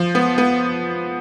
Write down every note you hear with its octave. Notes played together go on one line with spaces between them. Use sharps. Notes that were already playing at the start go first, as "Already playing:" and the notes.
Already playing: F3
B3
B3